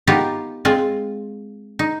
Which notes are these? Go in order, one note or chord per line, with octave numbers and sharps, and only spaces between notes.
B3 D#4 F4 G4 A#4
G#3 C4 F4
D#4